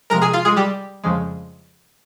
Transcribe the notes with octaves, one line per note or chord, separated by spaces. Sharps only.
C3 F3 G#3 A#4 A#5
G#4 G#5
F4 F5
G#3 G#4
G3 G4
F2 C#3 F3 G#3